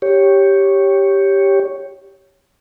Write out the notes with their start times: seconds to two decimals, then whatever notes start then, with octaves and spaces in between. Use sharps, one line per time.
0.02 G4 C#5